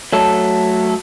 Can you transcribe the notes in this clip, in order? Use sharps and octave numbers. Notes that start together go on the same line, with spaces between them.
F#3 A3 A4